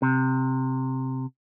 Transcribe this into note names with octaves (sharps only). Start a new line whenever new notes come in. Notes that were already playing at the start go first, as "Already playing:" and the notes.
C3